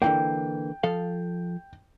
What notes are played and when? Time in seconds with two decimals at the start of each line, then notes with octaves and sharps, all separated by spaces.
0.02 D3 E3 A#3 G5
0.83 F3 A4 F5